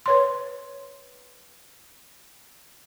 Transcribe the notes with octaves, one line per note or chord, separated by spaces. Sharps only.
B4 C#5 C6